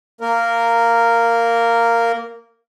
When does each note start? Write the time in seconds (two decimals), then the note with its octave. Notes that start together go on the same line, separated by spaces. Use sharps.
0.21 A#3 A#4